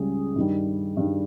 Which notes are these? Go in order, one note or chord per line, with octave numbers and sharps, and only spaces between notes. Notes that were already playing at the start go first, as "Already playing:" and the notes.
Already playing: C#2 C#3 G3 C#4 G#4
G2 D#3 G3
G2 D#3 G3